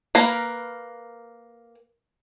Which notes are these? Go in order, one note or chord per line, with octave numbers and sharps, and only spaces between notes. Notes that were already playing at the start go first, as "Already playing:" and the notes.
A#3 A#4 B4